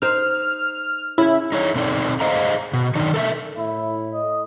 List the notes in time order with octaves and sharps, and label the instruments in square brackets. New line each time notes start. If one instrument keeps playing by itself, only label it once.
[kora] D#4 C5 [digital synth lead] F6
[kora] C#3 C#5 [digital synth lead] E4
[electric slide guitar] D#4 G#4 C#5
B2 C4 D#4 A4 D5
G#4 C5 D#5 F5 A#5
B2
D#3 F#3 D4 D#4
A4 A#4 E5
[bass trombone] A2 [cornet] E4
[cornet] D#5